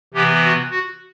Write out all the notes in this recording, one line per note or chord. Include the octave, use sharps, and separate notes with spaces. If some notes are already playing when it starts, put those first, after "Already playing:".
C3 E3 B3 G4
F#4
F#4